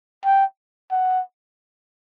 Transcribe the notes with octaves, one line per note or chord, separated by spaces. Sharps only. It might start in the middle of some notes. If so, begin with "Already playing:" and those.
G5
F#5